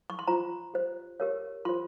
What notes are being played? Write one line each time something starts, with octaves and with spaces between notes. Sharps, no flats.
C#6
C6
F4 C5 A#5
G4 C5
G4 A#4 C#5
F4 C5 C6